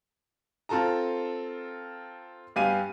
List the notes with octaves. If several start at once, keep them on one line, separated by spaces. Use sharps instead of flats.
C4 F4 A4 A5 A#5
G2 B3 G4 F5 G#5 D#7